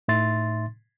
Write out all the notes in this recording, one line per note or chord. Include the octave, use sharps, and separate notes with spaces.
A2 D#4 E5 C6 A6